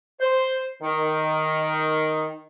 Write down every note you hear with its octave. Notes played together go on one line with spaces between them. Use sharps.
C5
D#3